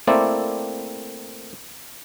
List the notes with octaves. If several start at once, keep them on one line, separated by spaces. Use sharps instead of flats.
A3 A#3 C4 E4 D5